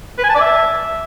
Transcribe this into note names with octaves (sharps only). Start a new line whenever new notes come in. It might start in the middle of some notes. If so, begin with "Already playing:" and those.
B4
G#5
A5
D5
E5